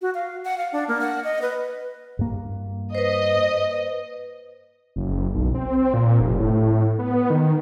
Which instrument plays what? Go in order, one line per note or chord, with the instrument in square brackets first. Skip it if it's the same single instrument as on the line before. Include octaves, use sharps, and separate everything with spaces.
[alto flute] F#4
F5
F#5
F5
D4
A#3
F#5
D#5
B4
[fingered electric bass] G2 A#3
[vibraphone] B4 C5 [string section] D#5
[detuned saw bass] F#1
B1
C4
A#2
F1
A2
B3
D#3